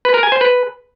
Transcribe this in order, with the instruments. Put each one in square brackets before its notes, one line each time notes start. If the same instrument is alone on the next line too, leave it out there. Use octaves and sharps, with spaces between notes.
[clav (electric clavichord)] B4
A#4
G#5
C5
B4